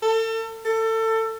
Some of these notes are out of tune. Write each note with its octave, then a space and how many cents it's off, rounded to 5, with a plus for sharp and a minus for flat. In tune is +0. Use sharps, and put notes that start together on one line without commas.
A4 +35
A4 +25